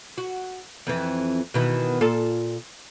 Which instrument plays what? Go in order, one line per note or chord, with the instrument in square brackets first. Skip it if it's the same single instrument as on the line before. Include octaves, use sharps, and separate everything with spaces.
[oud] F#4
F2 E3
B2 D#3 E3
A#2 F4 A4